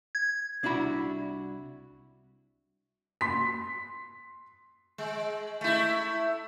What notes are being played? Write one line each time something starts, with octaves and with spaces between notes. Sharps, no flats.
G#6
C2 D4 E4 F#4 B5
C6 B6
G#3
A3 E4